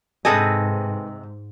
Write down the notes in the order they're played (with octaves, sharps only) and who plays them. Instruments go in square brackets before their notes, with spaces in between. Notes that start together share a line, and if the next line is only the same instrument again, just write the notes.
[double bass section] G#2 [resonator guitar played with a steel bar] C3 C4 D#5 [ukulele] G#4 A4 B4